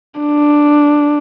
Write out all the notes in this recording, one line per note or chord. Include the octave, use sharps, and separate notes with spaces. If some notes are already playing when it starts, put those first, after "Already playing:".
D4